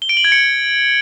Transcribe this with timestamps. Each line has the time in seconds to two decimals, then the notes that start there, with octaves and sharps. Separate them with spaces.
0.02 G7
0.09 D7
0.17 F#7
0.24 G#6
0.32 C#7